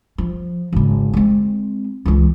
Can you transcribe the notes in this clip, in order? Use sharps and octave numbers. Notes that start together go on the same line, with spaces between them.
F3
G#1 C#3
G#3 C4
C#2 E3